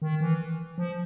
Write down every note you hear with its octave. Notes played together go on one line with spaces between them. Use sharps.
D#3
E3
F3